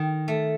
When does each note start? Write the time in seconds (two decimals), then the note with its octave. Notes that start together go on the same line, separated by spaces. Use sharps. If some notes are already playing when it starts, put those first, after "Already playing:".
Already playing: D#3
0.28 A3